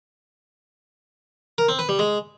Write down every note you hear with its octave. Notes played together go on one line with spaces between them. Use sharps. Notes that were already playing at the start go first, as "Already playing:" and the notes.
A#4
C4
B4
G3
G#3